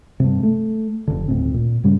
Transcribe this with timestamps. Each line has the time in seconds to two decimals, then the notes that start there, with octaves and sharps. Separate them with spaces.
0.20 G2 C3
0.43 A3
1.07 F1 D3
1.28 D#1 D2 A2 C4
1.54 A#2
1.84 G2 C#3 G3